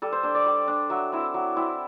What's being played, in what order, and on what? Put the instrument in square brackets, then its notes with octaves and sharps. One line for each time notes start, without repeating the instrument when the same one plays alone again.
[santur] G3 A4
C5
D4 C5
D5
G3
D4
F#3 E5
C4 E4
F#3
C4 E4